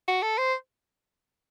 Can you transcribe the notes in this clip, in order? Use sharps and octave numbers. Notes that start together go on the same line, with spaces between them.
F#4
A4
C5